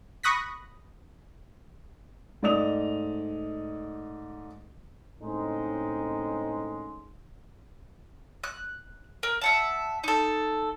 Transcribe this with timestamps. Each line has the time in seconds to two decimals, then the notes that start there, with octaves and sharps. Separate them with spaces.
0.23 B5 C#6 D#6 F#6 A#6 B6
2.43 G#2 A3 D5 D#5 D#6 F7
5.22 A2 C#3 G#3 C4 D#4
8.44 F#6
9.23 A#4
9.42 E5 F#5 A5
10.04 D#4 A4